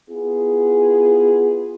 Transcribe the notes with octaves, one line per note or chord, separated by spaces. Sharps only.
B3 E4 F4 G#4